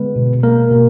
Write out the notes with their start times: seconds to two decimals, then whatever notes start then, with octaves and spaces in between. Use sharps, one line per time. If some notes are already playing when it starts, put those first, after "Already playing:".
Already playing: D3 G#3 B3 B4
0.16 B2
0.43 G#3 A#3 A#4
0.71 B2